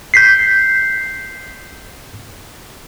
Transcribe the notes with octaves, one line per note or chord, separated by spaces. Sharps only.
G6 B6 C7